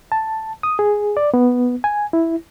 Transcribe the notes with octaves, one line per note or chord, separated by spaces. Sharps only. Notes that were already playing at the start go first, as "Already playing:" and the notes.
A5
D#6
G#4
D5
B3
G#5
E4